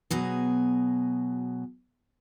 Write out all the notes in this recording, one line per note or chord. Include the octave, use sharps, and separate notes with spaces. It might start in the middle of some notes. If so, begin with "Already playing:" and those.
B2 F#3 G#4